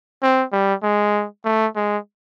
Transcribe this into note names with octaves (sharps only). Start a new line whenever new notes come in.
C4
G3
G#3
A3
G#3